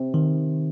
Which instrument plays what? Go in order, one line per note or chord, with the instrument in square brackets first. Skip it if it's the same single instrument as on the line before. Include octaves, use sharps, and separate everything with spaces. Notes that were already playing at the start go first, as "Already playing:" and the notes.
Already playing: [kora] C3
[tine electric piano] D#3